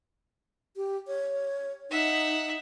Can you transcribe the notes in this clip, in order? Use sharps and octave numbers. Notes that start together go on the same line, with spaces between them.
G4
C#5
D#4 E5 F#5